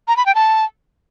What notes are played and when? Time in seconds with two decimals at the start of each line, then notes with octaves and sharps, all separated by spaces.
0.08 A#5
0.17 B5
0.26 G5
0.35 A5